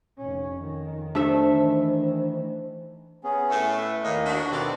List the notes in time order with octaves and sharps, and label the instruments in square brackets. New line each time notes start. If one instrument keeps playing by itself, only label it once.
[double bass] F1 C#4
F2 D#3
[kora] A3 E5 [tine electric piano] D4 [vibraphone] C5
[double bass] D#3 E3
[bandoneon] B3 C#4 G#4
[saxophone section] A2 A3
[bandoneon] B4 E5
[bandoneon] D#2 A#3 D#5 [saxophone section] A2
[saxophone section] D4 F#4
[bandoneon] B2 D#3 A4 [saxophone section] B3 C4 D5